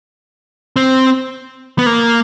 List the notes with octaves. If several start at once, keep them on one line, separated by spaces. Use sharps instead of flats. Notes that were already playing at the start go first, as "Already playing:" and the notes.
C4
B3
A#3